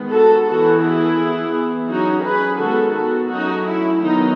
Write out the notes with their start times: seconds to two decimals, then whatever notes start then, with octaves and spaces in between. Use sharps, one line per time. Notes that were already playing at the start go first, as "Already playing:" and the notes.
Already playing: D#3 G#3 B3
0.11 F#4 A4
0.46 E3 B3 F#4 A4
0.82 E4 G#4
1.17 E3 B3
1.87 F#3 C#4 D#4 F#4
2.23 G#4 B4
2.58 D#3 G#3 B3 F#4 A4
2.94 F#4 A4
3.29 F#3 A3 C#4 D#4 F#4
3.65 E4
4.00 D#3 F#3 B3 D#4